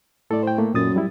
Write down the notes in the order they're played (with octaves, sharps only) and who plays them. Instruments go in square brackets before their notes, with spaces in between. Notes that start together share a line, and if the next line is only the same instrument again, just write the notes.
[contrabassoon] A2 [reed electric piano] A4 D5
[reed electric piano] C5 G5
A3 A#3
[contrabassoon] F#2 [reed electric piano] A#2 D#6 A6
[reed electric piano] F#3 G3 E4